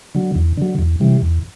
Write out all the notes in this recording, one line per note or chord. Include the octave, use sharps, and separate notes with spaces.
D3 F#3
E2
D3 F#3
E2
C3 E3 G3
E2